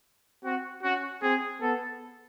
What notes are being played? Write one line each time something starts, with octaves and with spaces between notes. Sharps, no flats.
C4 F#4
C#4 F#4
C4 G#4
B3 A4